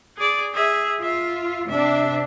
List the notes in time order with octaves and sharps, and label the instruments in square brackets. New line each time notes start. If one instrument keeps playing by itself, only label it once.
[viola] G#4 D5
G#4 E5
[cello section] F4 [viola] E5
[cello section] C3 D4 [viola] E5